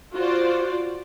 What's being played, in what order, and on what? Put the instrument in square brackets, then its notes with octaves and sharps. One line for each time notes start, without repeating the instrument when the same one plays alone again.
[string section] F4 F#4 C5 D5